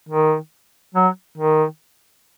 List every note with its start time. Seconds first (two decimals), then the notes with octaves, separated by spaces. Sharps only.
0.09 D#3
0.95 F#3
1.38 D#3